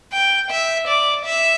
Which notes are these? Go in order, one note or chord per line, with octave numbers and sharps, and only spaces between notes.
G5
E5
D5
E5